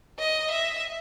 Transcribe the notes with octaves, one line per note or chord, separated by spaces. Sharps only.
D#5
E5